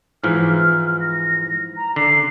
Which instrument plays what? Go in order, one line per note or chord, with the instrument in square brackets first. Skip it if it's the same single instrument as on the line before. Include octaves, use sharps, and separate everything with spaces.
[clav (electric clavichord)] G#2 E3 F3 [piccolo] F6
[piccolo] A#6
A#5
[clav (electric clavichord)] D3 [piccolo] C7